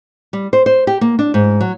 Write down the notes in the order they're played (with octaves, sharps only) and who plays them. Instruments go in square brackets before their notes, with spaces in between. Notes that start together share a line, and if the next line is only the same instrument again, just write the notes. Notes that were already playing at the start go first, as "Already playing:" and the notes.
[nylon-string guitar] G3
C5
C5
G4
A#3
D4
G#2
F#3